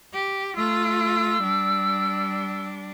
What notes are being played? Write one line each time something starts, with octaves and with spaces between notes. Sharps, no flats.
G4
A3 F4 E6
G3 D4